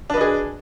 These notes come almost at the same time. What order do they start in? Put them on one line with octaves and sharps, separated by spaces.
D4 B4 D#5 G#4